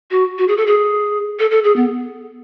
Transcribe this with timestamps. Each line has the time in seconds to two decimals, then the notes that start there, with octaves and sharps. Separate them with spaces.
0.11 F#4
0.38 F#4
0.48 G#4
0.57 A4
0.67 G#4
1.39 A4
1.51 A4
1.64 G#4
1.76 B3